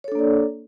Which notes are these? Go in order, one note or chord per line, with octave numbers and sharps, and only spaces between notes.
A#3 D4 A4 C#5 D5